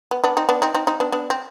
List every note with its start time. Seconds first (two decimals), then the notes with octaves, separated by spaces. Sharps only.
0.11 B3
0.24 B3 D4
0.37 C4 D#4
0.49 B3 D4
0.62 C4 D#4
0.74 C4 D#4
0.87 C4 D#4
1.00 B3 D4
1.12 B3 D4
1.30 C4